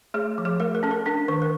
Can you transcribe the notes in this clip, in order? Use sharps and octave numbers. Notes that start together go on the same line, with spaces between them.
A3 G#4
F3
G#4
A3 A#4
A#4
C#4 A4
A#4
D4 A#4
D#3 B4
A#4